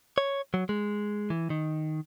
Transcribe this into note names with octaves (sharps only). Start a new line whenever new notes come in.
C#5
F#3
G#3
E3
D#3